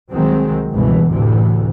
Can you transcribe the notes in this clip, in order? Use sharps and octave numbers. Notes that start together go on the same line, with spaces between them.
C2 D#3 F#3 G#3 C4
C#2 G2 B2 E3
F#1 D2 A2 C3 E3